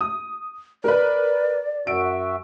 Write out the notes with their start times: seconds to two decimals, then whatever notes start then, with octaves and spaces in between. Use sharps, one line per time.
0.01 D#6
0.84 A#4 B4 D5
1.87 F#2 F#4 E5 D7